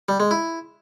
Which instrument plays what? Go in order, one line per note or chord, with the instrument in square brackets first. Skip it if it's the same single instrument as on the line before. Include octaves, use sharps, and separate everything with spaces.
[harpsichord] G3
G#3
E4